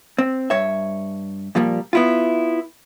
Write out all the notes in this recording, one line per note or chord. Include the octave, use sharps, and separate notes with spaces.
C4
G2 C#5 E5
A#2 F3 G3 A#3
B3 E4 F4